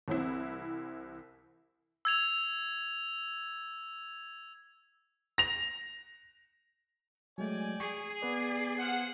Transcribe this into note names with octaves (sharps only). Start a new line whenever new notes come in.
C2 E3 C4 E4
E6 G#6 F7
A#6 F7
F#3 G#3 A3 D5 G5 G#5
G#4 C#6
B3 B4 D5
C5 F5 F#5